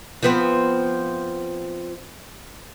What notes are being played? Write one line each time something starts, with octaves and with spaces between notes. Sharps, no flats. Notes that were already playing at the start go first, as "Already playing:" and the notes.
F3 B3 C4